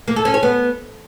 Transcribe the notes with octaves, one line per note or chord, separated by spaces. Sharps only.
A#3
A4
C#4
C#5
B3